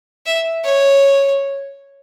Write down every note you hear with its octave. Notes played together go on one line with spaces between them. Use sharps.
E5
C#5